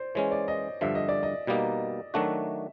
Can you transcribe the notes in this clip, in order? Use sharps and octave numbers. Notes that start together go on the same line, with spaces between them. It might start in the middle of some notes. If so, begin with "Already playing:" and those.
Already playing: C5 D5
E3 G#3 C#4 C#5
D5
D#5
G2 D3 F3 E5
D#5
D5
D#5
B2 G3 A#3 D#4
D#3 F#3 A3 D4 F#4 E5